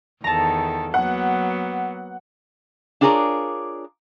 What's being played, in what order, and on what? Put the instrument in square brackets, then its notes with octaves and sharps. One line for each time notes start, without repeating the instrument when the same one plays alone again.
[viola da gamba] E2 D#3 A4 [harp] A5 A#5
[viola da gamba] F#3 A#3 B3 [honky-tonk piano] F#5
[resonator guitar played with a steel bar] D4 F4 G#4 A#4 C#5 D5